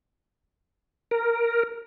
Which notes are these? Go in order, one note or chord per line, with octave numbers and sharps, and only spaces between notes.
A#4